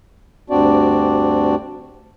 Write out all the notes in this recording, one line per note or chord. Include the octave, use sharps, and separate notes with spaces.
D2 G2 C4 D4 F#4 D5